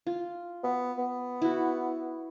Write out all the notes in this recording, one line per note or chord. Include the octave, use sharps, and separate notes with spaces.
F4
B3
B3
E4 F#4